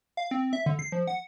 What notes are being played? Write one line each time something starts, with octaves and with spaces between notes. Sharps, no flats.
F5
C4
E5
D3
C7
F3
F#5